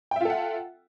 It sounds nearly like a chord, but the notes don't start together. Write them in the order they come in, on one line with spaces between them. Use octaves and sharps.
G5 E5 F4 A4 F#5